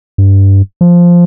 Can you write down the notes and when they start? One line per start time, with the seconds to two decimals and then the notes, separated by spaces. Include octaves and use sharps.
0.18 G2
0.81 F3